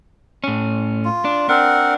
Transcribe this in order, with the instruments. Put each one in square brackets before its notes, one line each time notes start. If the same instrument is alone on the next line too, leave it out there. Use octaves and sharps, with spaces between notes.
[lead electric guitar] A2 C#4
[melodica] F4
[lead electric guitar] D4
[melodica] C4 A#4 F#5 [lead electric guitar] D4